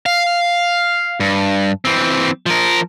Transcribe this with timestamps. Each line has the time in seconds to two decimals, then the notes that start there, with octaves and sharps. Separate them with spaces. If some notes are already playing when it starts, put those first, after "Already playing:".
0.06 F5
1.20 G2
1.85 E3 C4
2.46 F3 A#4